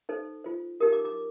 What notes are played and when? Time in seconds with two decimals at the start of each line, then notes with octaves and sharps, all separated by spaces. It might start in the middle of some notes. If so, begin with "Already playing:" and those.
0.09 D#4 A4 C5
0.44 F4 C5
0.80 D#4 G4 A#4 D#6
0.92 D6
1.05 D6